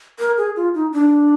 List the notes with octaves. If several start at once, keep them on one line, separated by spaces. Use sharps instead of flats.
A#4
G#4
F4
D#4
D4